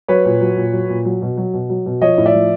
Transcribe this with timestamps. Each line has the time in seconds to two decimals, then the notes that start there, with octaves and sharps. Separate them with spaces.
0.08 F#3 B4 C#5
0.25 A#2
0.41 F#3
0.56 A#2
0.73 F#3
0.89 A#2
1.05 F#3
1.22 B2
1.37 F#3
1.53 B2
1.69 F#3
1.86 B2
2.01 F3 C#5 D#5
2.18 A2
2.26 D5 E5
2.34 F3